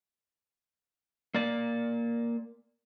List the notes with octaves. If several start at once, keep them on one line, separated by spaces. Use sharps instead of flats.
A#3 D5